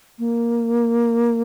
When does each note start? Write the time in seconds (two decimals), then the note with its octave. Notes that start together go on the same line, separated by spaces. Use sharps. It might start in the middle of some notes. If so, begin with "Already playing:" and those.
0.19 A#3